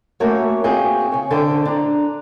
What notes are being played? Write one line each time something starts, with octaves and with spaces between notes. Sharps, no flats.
A3 A#3 C#4 F#4 C#5
A#3 C4 F#4 G#4 G5
C#3 C#5
D3 C5 G5
D4 A#5